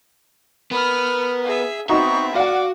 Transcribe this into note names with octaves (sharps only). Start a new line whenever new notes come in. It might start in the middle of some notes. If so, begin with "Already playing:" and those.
B3 A#4 B5 F6
G#4 E5
B3 C4 D#4 F#4 D#5 E5 C#6
F#4 D5 F5 F#5 D6